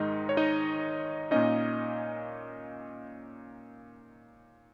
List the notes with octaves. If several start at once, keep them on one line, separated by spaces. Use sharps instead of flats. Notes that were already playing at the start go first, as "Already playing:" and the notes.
Already playing: G#2 D#3 G#3 D#4 D#5
C#5
D#4 D#5
A#2 A#3 C#4 D#4 D#5